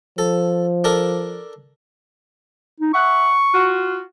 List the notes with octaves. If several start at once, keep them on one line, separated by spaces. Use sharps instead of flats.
F3 A4
D4 A4 A#4
D#4
E5 F#5 C#6
F4 F#4